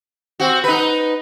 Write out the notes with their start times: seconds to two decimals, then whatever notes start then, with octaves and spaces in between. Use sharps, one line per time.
0.40 C4 F#4
0.64 D#4 B4